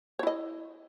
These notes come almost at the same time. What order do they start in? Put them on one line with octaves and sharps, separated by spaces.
C#5 E4 D#5